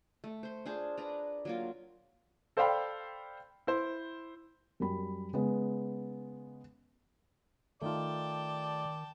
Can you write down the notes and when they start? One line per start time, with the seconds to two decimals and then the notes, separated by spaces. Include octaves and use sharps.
0.24 A3
0.43 C5 C6
0.66 D4 F4 G#4 C5
0.97 D4 B4 D5 A#5
1.45 F#3 A#3 F4
2.57 A4 C5 D5 F5 G5 B5
3.67 E4 C5
4.80 F#2 G3 B5
5.33 C#3 G#3 B3
7.82 D#3 A3 D#4 F4 D5 G5 A5